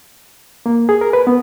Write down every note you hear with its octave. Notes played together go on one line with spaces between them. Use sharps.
A#3
G#4
A#4
B4
B3